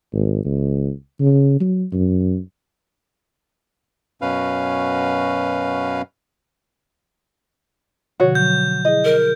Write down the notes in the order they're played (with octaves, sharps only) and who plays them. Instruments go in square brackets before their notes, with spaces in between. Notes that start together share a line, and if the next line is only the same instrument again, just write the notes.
[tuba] G#1
C#2
C#3
F#3
F#2
[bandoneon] F#2 B2 C#4 B4 F5
[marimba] B2 D3 F3 [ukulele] F#4 C#5
[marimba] F#3 [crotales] G6
[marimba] E4 G#4 [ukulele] D#5
[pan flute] A#4